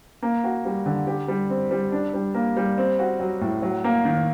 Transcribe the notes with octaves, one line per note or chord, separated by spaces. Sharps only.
A#3
F#4
G3
D3
G4
G3
C4
G3
D4
G3
A#3
G3
C4
F#4
F#3
A2
F#3
A#3
D#3